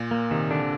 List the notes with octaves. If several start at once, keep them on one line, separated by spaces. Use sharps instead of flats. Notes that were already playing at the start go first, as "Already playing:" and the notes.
Already playing: A#2
A#3
C3 D#3
D3 D4